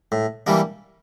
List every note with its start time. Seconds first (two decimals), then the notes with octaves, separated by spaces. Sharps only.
0.12 A2
0.47 E3 G3 A#3 D4